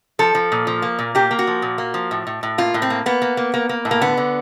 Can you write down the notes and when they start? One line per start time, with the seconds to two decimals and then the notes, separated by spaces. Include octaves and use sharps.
0.19 F3 A4
0.35 F3
0.52 A#2
0.67 F3
0.82 A#3
0.99 A#2
1.15 A#3 G4
1.31 A#3
1.39 F#4
1.47 F3
1.62 A#2
1.78 A#3
1.94 F3
2.11 A2
2.27 A2
2.43 A2
2.58 A#3 F4
2.74 A2
2.82 C4
2.90 A#3
3.06 A#3 B3
3.22 A#3
3.37 A#3
3.54 A#3
3.69 A#3
3.85 A2
3.91 A#3
4.01 D3 B3
4.17 D3